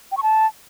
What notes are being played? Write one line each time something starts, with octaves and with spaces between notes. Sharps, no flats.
G5
C#6
A5